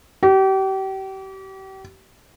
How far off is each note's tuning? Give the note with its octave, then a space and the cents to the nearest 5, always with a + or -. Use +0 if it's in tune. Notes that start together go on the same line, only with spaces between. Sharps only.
G4 -35